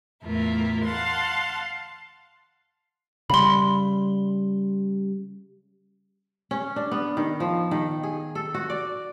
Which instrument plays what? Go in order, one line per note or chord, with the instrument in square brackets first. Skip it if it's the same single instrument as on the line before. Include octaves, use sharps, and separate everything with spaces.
[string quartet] E2 A2 E4 F4 A#4
F5 F#5 A5 C6
[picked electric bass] C#3 G3 [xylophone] B5 C6
[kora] C#4
D4
B3
D#3
F3
D#3
G#4
A4
F#4
D5